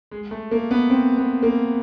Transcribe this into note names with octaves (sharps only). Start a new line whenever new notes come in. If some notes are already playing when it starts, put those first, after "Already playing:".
G#3
A3
A#3
B3
C4
B3
A#3